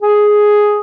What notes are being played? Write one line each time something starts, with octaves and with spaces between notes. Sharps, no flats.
G#4